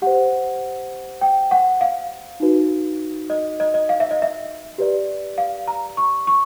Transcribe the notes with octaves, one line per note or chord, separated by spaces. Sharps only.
G4 C5 F#5
G5
F#5
F5
D#4 F#4 B4
D#5
D#5
D#5
F5
E5
D#5
E5
G4 B4 D5
F5
A#5
C#6
C#6